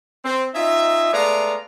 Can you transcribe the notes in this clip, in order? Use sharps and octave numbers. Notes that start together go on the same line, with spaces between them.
C4
C#4 D#4 F4 D#5 E5
G#3 A3 B3 D5 F5 A#5